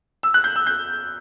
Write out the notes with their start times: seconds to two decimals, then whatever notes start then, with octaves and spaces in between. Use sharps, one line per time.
0.23 E6
0.34 F#6
0.44 G6
0.56 E6
0.67 G6